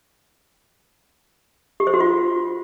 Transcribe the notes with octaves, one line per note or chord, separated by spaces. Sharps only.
G4
C5
F#4
F4